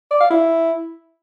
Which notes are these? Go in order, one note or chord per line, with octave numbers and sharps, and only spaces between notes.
D5
F5
E4